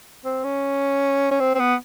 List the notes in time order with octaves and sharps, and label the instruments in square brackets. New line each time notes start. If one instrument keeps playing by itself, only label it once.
[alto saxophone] C4
C#4
C#4
C4
C4
B3